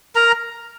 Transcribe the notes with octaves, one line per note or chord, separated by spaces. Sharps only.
A#4 A#5